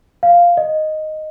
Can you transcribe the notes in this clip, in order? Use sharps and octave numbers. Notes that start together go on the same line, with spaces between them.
F5
D#5